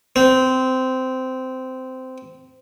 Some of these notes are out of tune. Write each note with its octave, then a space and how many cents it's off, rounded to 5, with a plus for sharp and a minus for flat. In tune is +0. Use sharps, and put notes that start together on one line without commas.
C4 -15